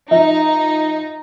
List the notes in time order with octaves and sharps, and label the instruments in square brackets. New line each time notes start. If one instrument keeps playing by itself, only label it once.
[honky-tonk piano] F3 D#5 E5 [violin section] D#4